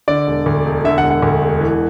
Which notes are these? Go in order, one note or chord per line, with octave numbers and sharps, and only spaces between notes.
D3 D5
E1
D2
E1
D3 E5
F#5
E1
F#5
D2
E1
E3